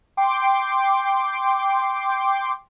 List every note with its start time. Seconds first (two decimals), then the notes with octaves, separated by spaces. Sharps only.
0.17 G5 C6 D6